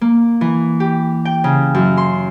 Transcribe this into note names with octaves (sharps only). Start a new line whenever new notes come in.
A#3
E3
G4
G5
C#3
F#2
C6